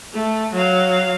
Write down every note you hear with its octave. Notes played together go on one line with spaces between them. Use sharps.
A3
F#3 F5